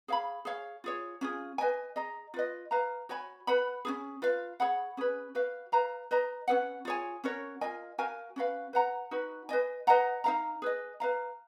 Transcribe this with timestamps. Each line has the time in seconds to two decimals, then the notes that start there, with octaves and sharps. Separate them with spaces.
0.08 G#4 C#5 F5 B5
0.45 G#4 C#5 F5
0.84 F4 G#4 C#5
1.21 C#4 F4 G#4
1.58 B4 D#5 G#5
1.96 G#4 D#5 A#5
2.34 F4 B4 D#5
2.71 B4 F5 A#5
3.09 F#4 C#5 G#5 B5
3.47 B4 F#5 B5
3.85 C#4 F4 G#4
4.22 F4 B4 F5
4.60 G#4 C#5 F#5 B5
4.97 C#4 G#4 B4
5.35 F#4 B4 F5
5.72 B4 F5 A#5
6.11 B4 D#5 A#5
6.48 C#4 G#4 B4 F#5
6.85 F4 G#4 C#5 G#5
7.24 C#4 F#4 A#4 C#5
7.61 F4 A#4 D#5 G#5
7.98 F#4 A#4 F5 G#5
8.36 C#4 F#4 B4 F5
8.73 B4 F#5 A#5
9.11 D#4 F#4 B4
9.49 B4 D#5 G#5
9.87 B4 D#5 F#5 A#5
10.24 D#4 A#4 F5 A#5
10.62 G#4 B4 D#5
11.00 B4 F5 A#5